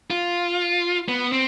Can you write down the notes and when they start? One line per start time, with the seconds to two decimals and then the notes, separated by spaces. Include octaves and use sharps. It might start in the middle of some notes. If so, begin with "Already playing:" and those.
0.10 F4
1.08 B3
1.32 C4